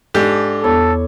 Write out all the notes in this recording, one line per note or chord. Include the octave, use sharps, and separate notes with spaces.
G#2 D4 G4 A4
E2 B3 A4 C#5